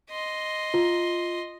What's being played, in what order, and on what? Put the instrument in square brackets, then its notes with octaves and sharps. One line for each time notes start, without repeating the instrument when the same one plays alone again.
[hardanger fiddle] D#5 C6
[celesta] F4